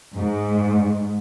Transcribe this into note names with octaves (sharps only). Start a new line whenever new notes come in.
G#2